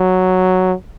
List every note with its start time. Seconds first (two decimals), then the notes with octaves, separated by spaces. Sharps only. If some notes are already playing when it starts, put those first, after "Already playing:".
Already playing: F#3